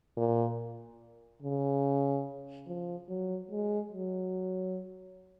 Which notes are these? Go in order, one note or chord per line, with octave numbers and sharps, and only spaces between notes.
A#2
C#3
F3
F#3
G#3
F#3